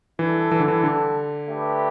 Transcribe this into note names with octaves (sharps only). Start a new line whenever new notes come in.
E3 G3 D4 A4
E3
D3
E3
D3
A3 D4 G4 B4